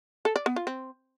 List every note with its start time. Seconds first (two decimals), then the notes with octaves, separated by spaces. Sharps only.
0.25 A4
0.36 D5
0.46 B3
0.56 F4
0.67 C4